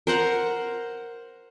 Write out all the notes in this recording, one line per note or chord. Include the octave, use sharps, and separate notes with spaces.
A#4 C5 F#5 A#5